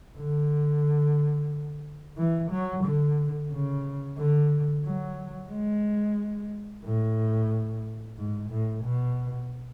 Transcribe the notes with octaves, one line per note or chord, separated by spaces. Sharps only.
D3
E3
F#3
D3
C#3
D3
F#3
G#3
A2
G#2
A2
B2